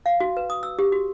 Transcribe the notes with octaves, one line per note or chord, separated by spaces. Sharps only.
F5
F#4
B4
D#6
E6
G4
F#4